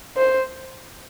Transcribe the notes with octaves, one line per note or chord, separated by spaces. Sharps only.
C5